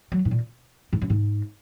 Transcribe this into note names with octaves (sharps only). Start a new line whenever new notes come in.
F#3
G#2
A#2
G#2
F#2
G#2